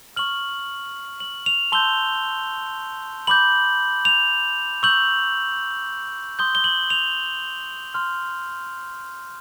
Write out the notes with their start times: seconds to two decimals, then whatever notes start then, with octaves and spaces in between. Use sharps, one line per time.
0.16 C#6 F6 F#7
1.20 F#7
1.46 F7
1.72 A5 C6 E6 G6 G7
3.27 B5 D6 G6 F#7
4.05 F7
4.83 C#6 E6 G6 F#7
6.39 C6 D#6 G6 G7
6.55 G7
6.64 F#7
6.90 F7
7.94 C6 F6